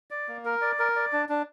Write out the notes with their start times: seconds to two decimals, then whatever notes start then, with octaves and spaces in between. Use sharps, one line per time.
0.11 D5
0.28 A#3
0.45 A#4
0.61 D5
0.79 A#4
0.96 D5
1.13 D4
1.29 D4